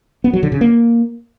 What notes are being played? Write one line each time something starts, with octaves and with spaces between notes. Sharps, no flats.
B3
F#3
D3
C#3
A#3